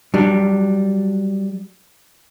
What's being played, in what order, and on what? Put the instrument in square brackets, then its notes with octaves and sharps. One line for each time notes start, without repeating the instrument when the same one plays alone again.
[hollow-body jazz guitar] F#3 G3 D4